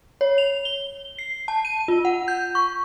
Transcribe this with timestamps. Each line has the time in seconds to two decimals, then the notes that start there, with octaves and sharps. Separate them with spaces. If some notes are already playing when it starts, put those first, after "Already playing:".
0.21 C#5
0.38 F7
0.65 G7
1.18 C7
1.48 A5
1.65 D#7
1.88 F4
2.05 F#5
2.28 G6
2.55 C#6